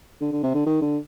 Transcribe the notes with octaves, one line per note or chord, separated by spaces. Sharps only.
D3
D3
C3
D3
D#3
D3